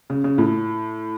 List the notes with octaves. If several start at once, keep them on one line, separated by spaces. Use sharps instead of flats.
C#3
C#3
A2